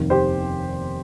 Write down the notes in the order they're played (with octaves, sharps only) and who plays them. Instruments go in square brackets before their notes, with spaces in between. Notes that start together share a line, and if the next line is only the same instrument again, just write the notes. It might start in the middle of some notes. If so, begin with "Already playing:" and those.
Already playing: [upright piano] F1 D#2 D#3
G4 C5